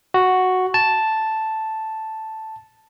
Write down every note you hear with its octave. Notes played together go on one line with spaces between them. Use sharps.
F#4
A5